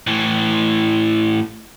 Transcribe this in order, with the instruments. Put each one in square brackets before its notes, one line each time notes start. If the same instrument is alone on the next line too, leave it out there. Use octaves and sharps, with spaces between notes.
[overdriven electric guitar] A2 E3